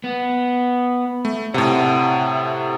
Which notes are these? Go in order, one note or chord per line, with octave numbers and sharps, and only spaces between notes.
B3
A3
A2 C3 F#5 A5